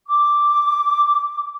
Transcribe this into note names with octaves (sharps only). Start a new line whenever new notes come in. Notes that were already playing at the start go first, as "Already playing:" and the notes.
D6